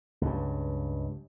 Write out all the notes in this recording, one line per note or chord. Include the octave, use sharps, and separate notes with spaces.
C#2 G2